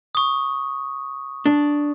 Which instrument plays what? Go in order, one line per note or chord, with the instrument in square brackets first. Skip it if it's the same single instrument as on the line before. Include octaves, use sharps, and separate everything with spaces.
[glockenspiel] C#6 D#6
[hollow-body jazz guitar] D4